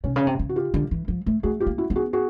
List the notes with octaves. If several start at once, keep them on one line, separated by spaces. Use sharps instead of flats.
C3 C#4
C#3
C#4
C3
C#3
F#4
F4 G4
D3
E3
F3
A3
A3 F#4 G#4
F4 G4
A#3
E4 F#4
B3
F#4 G#4
F#4 G#4